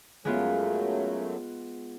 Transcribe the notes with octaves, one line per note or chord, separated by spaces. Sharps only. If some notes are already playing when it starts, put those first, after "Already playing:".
F#2 F#3 G#3 A3 B3 F4